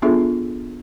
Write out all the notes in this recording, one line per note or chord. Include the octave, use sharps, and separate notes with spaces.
B3 D4 F4 G#4 A4 E5